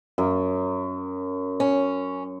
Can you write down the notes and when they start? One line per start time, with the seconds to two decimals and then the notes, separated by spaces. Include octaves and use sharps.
0.18 F#2
1.60 C#4